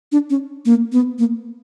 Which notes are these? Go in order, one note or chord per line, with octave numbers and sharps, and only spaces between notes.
D4
C#4
A#3
B3
A#3